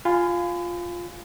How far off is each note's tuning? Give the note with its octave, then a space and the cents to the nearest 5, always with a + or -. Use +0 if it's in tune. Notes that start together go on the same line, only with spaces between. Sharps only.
F4 +0 G#5 +0 B5 +40